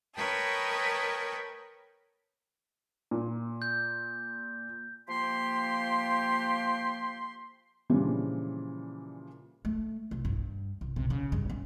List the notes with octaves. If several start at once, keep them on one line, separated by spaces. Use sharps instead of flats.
A#4 B4 C#5 D#5 G5 A5
A#2
G6
F3 A#3 G4 G5 C6
A#2 C#3 E3 F3 G3 D4
A3
C2
G2
C2
C3
C#3
G2
C#4